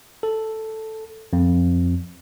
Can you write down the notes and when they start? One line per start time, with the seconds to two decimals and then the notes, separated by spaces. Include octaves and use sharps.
0.23 A4
1.33 F2